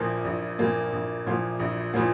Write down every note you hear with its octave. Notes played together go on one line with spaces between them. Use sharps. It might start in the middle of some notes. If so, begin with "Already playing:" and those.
Already playing: A#1 A#2 F3 A#3
A#1
A#2 F3 A#3
A#1
A#2 F3 A#3
A#1
A#2 F3 A#3